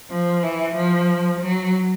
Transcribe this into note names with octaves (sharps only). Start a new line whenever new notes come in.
F3
E3
F3
F#3